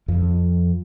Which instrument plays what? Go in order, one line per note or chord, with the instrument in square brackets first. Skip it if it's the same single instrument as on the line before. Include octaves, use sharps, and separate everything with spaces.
[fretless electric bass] F2 F3